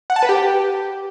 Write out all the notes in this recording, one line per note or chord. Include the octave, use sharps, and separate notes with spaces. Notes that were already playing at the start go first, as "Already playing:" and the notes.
F#5
A5
B4
G4